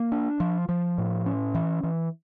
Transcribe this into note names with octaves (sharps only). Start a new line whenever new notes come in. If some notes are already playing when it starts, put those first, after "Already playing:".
Already playing: A#3
D4
F3
F3
A2
C#4
E3
E3